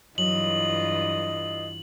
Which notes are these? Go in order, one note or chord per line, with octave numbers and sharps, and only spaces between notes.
G2 E3 F#3 F4 D#5 F#7